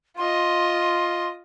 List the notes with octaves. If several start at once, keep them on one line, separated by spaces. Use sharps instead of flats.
F4 D#5 C6